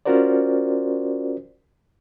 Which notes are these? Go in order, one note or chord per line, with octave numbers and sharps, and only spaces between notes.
C#4 F4 F#4 A#4 C5 D5